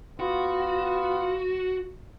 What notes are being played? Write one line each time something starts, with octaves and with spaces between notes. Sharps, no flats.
B3 F4 F#4